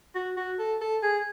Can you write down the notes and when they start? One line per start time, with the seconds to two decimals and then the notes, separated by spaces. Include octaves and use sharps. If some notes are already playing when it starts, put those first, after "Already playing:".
0.15 F#4
0.37 F#4
0.59 A4
0.81 A4
1.03 G#4